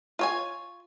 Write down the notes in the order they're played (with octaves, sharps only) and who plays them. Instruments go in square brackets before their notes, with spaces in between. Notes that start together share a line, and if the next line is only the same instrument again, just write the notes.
[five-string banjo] F4 C#5 G#5